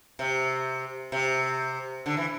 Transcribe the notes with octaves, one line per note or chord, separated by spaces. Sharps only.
C3
C3
D3
E3